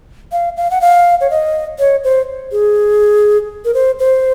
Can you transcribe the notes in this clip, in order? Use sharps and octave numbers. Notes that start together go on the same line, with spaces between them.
F5
F5
F#5
F5
C#5
D#5
C#5
C5
G#4
A#4
C5
C5